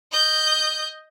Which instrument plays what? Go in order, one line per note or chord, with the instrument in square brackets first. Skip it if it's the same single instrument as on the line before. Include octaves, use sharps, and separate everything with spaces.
[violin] D#5 G6